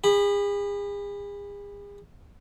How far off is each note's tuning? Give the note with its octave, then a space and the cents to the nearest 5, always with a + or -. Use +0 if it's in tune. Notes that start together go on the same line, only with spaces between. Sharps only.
G#4 -40 B5 +0